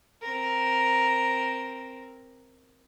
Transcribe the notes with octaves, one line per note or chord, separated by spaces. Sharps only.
C4 A#4